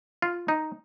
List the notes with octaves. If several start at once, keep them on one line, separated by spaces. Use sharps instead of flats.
F4
D#4